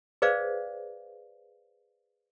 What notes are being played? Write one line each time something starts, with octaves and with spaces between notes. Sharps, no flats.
G#4 B4 C5 D5 F5